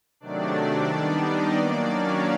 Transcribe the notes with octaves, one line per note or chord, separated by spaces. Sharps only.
C3 D#3 F#3 A3 D4 D5
D#3 G3 B3 D4 D5
D#4 D#5
D#3 F#3 A#3 D4 D5
C#4 C#5